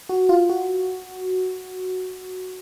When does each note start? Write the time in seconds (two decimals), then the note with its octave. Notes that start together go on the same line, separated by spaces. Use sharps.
0.09 F#4
0.29 F4
0.50 F#4